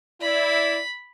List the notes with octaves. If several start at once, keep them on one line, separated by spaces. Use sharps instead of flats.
E4 D5 B5